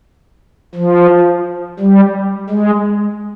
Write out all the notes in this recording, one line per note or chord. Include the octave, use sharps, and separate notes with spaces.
F3
G3
G#3